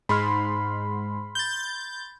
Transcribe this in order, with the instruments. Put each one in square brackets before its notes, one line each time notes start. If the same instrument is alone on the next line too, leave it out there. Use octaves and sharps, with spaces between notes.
[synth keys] G#2 [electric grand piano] B5 C6 F6
[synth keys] G6 A6